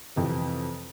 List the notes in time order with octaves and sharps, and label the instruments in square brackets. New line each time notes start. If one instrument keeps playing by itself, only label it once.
[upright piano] F2 C3 E3